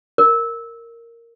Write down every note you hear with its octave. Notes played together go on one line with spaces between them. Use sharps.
A#4